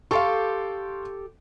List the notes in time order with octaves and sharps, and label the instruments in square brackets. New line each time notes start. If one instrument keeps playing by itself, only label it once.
[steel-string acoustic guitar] G4 A4 [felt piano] F5 C6 C#6